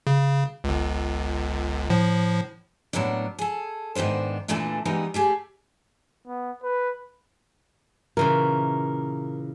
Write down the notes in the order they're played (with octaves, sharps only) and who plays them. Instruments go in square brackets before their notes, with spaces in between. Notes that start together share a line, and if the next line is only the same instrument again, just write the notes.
[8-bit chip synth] C#3
G1 C#2
A2 F3
[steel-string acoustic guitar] A2 F#3 A#3 B3 D4
G#4 A4
G#2 D#3 B3 D4 C5
E2 A#2 D3 E3 A3 D4
E3 G3 G#3 B3 D#4
A3 G4 G#4
[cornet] B3
B4
[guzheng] A#2 C#3 E3 [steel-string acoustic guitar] A#4